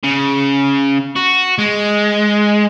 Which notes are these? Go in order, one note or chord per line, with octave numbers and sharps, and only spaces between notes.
C#3
F#4
G#3